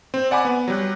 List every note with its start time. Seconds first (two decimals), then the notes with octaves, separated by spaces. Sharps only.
0.14 C4
0.31 D5 F#5 G#5 B5 D6
0.45 B3
0.68 F#3 G3 F#6